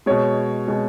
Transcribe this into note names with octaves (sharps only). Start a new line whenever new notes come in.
B2 G#3 C#5
B2 G#3